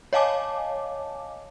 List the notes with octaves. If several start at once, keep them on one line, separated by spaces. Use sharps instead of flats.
C#5 D#5 F5 G#5 A5 D6